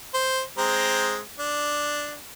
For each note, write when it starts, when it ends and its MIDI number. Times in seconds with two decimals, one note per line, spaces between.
0.14 0.41 72
0.58 1.18 56
0.58 1.18 60
0.58 1.18 82
1.40 2.15 62